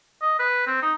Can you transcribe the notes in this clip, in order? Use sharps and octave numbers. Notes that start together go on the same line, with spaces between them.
D#5
B4
C4
D#4